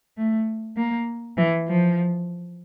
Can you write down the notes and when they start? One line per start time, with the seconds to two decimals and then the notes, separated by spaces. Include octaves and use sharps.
0.17 A3
0.77 A#3
1.37 E3
1.68 F3